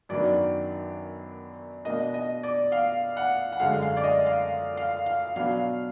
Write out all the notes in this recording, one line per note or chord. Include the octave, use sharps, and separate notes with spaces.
F#2 D#3 F#3 B3 D4 D5
B2 A#3 D4 D#5
D#5
D5
F5
F#5
F#5
F#2 D3 G#3 F5
F5
D5
D#5
F5
F5
F5
B2 F#3 B3 D4 F5